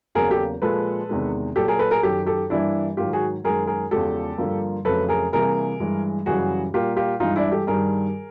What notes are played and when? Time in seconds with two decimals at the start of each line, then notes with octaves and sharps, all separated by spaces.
0.15 E2 C#3 F#3 A#3 G#4 A#4
0.31 G4 A4
0.62 A#2 F3 G#3 A4 B4
1.09 E2 C3 D#3 G#3
1.56 A#2 F#3 A#3 G4 A4
1.68 G#4 A#4
1.79 A4 B4
1.91 G#4 A#4
2.03 F#2 D#3 F#3 G4 A4
2.26 G4 A4
2.50 G2 E3 G3 A#3 D4 E4
2.97 G#2 D#3 F#3 F4 G4
3.13 F#4 G#4
3.44 F#2 D#3 G#3 G#4 A#4
3.67 G#4 A#4
3.91 E2 C#3 F3 G#3 G4 A4
4.38 G2 D3 F3 A#3
4.85 F2 C#3 F#3 A3 A4 B4
5.08 G#4 A#4
5.32 C3 E3 G3 A#3 G#4 A#4
5.80 G2 E3 G#3
6.26 F#2 C#3 E3 G3 F#4 G#4
6.74 A#2 G3 A#3 F4 G4
6.97 F4 G4
7.20 G2 E3 G#3 D#4 F4
7.36 D4 E4
7.52 G4 A4
7.67 G2 D#3 G3 G#4 A#4